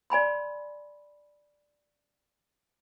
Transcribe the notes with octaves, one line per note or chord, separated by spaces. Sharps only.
D5 G#5 B5 C6